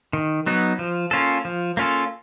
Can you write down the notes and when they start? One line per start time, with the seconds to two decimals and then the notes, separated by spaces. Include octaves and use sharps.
0.13 D#3
0.46 F#3 B3 D#4
0.79 F3
1.11 A#3 C#4 F4 A4
1.45 F3
1.77 A#3 C#4 F4 A4